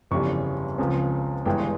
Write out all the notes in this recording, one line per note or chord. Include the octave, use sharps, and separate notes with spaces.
G1 F2 C#3 E3 G3 C#6
C#2 C#3 F3 C4
G1 G2 E3 G#3 G5